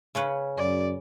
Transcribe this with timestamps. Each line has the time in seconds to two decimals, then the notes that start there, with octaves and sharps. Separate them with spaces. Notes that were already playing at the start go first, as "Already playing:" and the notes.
0.15 C#3 C#4 B4
0.57 F#2 D5